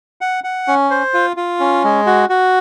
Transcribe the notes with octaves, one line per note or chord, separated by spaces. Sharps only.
F#5
F#5
C#4
C5
F4
F4
C#4
G#3
F#4
F#4